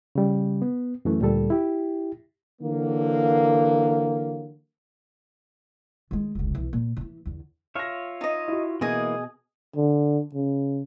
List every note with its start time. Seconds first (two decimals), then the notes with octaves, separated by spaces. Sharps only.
0.15 C#3 G3
0.62 B3
1.05 F#2 E3 A3
1.21 D2 A#2 G3 A4
1.50 E4 G4
2.61 D3 E3 F#3 A#3
6.11 D#3 G#3
6.35 F1 C#2
6.55 B1 E3
6.73 A#2
6.97 D3 E3
7.26 E2 D3
7.76 F4 C#5 E5 F6 A#6
8.21 D#4 D#5
8.48 E4 F#4
8.81 B2 E3 A#3 G#4 D#5 G#5
9.76 D3
10.34 C#3